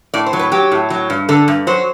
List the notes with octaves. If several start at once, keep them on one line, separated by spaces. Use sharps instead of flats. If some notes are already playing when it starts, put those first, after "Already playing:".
A2 D5
C5
F#3
B4
F#3 G4
A2
F#3
G2
D3 A4
G2
F#3 C5